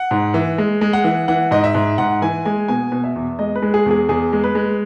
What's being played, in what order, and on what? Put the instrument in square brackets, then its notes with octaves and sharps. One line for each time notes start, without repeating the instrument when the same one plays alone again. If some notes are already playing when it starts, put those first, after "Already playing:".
Already playing: [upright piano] F#5
G#2
E3
G#3
G#3
F#5
E3
E3 F#5
G#2 D#5
E5
G#2
G#2 F#5
E3 G#5
G#3 G#5
B2 G#5
B2
E5
E2
G#3 D#5
B4
G#3
G#4
E2 G#4
E2 G#4
G#3
B4
G#3